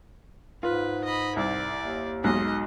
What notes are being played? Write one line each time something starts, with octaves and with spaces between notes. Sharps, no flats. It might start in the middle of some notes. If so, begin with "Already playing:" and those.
G#2 F4 B4
D#5 B5
C2 E4 D5
D#2
B1 G#2 D#5